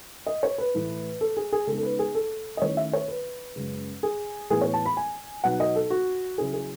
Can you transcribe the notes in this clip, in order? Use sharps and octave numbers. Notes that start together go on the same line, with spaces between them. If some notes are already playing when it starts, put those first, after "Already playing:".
D#5
C#5
B4
A2 E3 A3 E4
A4
G#4
G#4
C#3 G#3 B3 D#4 A4
A4
B4
G#4
A4
D#5
D#3 A3 C#4 E4 C#5
E5
C#5
B4
F#2 C#3 G#3
G#4
A2 E3 B3 E4 G#4
C#5
A5
B5
G#5
B2 F#3 B3 D#4 F#5
D#5
A4
F#4
C#3 F#3 C#4 E4 G#4
G#4